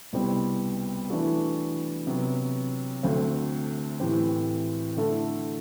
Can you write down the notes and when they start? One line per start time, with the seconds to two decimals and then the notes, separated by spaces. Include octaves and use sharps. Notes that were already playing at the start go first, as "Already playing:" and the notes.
0.13 C2 B2 G3 C4
1.09 E3 A3 D4 F#4 A4
2.07 C3 F#3 B3
3.03 D2 D3 A3 C4
4.00 A2 E3 A3 C4 G4
4.97 D3 A3 E4 A4